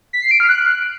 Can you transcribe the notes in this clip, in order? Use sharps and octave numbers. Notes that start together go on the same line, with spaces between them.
B6
C7
D7
F6
F#6